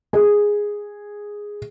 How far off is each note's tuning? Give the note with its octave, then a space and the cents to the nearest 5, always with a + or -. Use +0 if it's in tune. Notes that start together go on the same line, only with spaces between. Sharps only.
G#4 -5